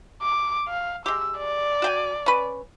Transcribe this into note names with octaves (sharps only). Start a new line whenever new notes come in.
D6
F5
G#3 G4 E6
D5
F#4 G5 G#5
C#4 B4